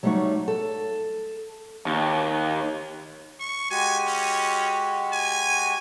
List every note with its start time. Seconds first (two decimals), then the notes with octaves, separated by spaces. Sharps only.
0.03 F#3 G3 A3 D#4 F#4 C#5
0.48 A4
1.86 D#2
3.40 C#6
3.71 G#3 F#4 G4 G#5
4.07 C#4
5.13 G#5